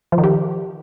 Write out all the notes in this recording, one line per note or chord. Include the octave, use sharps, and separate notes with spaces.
F3
D#3
G4